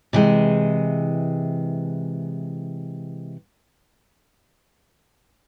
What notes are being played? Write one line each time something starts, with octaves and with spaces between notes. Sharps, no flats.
C3 E3 G#3